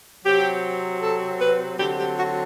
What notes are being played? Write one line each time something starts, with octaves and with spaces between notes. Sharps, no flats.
C3 F#3 C4 G4
A4
B4
D3 F#3 C4 G4
G4
F#4